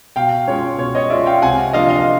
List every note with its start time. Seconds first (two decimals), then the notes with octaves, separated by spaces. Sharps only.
0.16 B2 F5 G5
0.48 G#3 C#4 F4 C#5
0.78 B2 C#5
0.95 C#5 D#5
1.10 G#3 C#4 F4 D5 E5
1.26 F5 G5
1.42 C3 F#5 G#5
1.73 F3 A#3 D4 F4 D#5 F5
1.89 D#5 F5